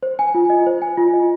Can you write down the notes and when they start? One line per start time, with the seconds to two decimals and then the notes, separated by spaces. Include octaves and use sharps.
0.03 C5
0.19 G#5
0.35 F4
0.50 D#5
0.66 C5
0.82 G#5
0.97 F4
1.13 D#5